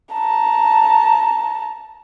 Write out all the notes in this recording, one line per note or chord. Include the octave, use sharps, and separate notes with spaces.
A5 A#5